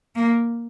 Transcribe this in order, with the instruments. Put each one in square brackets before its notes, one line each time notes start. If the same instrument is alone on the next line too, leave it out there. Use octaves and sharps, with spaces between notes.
[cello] A#3